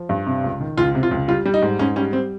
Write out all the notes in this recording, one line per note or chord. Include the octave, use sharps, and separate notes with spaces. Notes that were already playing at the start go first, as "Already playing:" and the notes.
Already playing: F3
G2
C3
C#2
D#3
C#2 F4
C3
F4
C#2
G3 F4
G3
D#4
G#2
G#2 C#4
G3 C#4
G3 C4